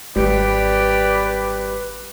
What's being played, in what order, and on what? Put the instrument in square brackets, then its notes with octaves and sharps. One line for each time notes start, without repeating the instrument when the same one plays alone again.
[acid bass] G#1 [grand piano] G3 [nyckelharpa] G4 D5 [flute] B4